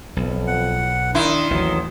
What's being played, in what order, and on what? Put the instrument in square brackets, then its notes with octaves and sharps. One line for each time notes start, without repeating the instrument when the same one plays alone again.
[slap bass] B1 [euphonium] F2
[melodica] F#5
[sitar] D#3 E4 [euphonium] D4 [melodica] C6
[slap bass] A1 D#2 [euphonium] F#3